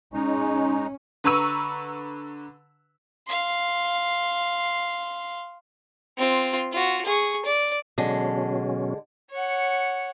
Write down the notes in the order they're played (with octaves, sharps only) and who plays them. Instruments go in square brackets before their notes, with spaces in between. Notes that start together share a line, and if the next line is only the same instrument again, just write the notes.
[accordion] G#3 D#4 [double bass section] C#4
[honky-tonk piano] D3 B4 A#5 C#6 E6 D#7
[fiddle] F5 C6
C4 F4
F4 F#4
G#4 C#6
D5
[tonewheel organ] B2 F#3 C#4 [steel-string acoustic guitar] D3 G#3
[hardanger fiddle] C#5 F#5